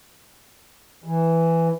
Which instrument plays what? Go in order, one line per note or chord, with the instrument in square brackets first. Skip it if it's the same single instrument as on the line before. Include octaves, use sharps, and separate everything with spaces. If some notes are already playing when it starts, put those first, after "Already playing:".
[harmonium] E3